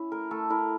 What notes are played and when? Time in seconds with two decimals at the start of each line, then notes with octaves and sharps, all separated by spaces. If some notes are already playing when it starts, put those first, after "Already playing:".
Already playing: C#4 E4
0.12 A3 A#4
0.31 A3 A4
0.50 E4 A#4